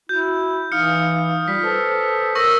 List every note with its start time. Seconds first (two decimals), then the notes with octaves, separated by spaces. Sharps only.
0.09 E4 F#4 G6
0.72 E3 D#4 F5 D#6 F6 C#7
1.48 G3 F4 B6
1.63 A4 B4 C5
2.35 A#4 C#5 C#6 E6 A#6